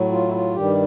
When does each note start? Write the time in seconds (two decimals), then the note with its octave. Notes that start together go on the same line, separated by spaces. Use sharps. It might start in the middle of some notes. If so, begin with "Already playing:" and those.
Already playing: A2 F#3
0.12 F4
0.28 E4
0.33 F4
0.55 G2 D#3 G3 G4